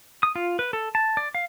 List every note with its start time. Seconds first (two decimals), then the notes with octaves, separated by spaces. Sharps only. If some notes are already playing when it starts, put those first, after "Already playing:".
0.23 D#6
0.36 F4
0.59 B4
0.73 A4
0.95 A5
1.17 D5
1.35 F5